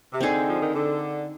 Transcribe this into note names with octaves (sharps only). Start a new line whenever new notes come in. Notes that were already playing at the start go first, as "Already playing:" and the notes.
C3
D3 C4 D#4 G#4
F3
D#3
D3